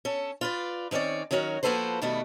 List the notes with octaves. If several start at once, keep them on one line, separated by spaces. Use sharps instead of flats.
C#4 A4
F4 B4 D5
D#3 C4 C#4 C#5 D5
D#3 F#3 C#4 F#4 A#4
F3 A#3 F#4 A4 B4 C5
B2 D#3 G3 A3 B3